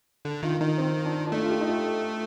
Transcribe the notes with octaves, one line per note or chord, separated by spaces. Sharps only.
D3
D#3 F4
D#3 D#4
C4
D4
D4
A3 D#4
F4
G4
D#4
F4